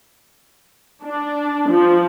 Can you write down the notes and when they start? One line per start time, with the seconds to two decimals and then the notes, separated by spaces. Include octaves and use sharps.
1.04 D4
1.71 F3